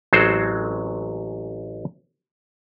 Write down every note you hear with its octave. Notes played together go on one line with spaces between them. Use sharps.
A1 F#3 G#3 C4 A4 C5